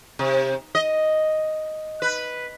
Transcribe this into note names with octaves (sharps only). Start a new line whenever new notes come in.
C3
D#5
B4